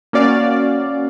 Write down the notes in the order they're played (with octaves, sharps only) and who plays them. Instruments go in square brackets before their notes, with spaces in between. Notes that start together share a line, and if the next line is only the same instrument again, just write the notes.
[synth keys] A#3 C#4 F#4 D5 F5